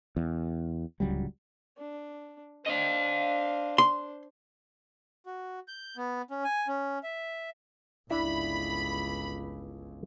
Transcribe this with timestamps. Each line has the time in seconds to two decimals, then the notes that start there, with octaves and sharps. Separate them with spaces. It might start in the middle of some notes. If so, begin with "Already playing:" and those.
0.16 E2
1.00 D1 C#2 F#3 G3
1.78 D4
2.66 D4 C5 D#5 F5
3.78 C6
5.26 F#4
5.68 G6
5.97 B3
6.30 C#4
6.45 G#5
6.68 C#4
7.03 E5
8.10 G1 C#2 D4 E4 E5 B5